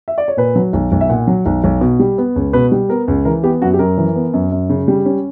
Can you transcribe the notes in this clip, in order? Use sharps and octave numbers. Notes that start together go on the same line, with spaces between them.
E5
D5
C#5
A#2 B4
F#3
B1
B1
E5
A#2 F#5
F#3
B1
B1
B2
G3
B3
C#2
B2 B4
G3
B3 A#4
C#2
E3 A#4
B3 G4
F#2 F#4
G4
F#2 A#4
E3
B3
F#2
F#2
C#3
G3
C#4